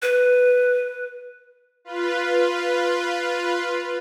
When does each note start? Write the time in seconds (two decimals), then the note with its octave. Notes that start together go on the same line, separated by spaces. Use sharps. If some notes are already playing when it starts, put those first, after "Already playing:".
0.02 B4
1.85 F4 B4